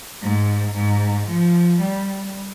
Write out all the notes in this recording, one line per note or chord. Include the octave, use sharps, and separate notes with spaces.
G#2
G#2
F3
G3